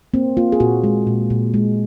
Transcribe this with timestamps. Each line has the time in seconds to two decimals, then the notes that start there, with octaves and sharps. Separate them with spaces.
0.14 A#3 C4
0.37 A#3 F4
0.52 G#4
0.60 A#2 F#4
0.84 G#3
1.07 A#2
1.30 A#2
1.54 G#3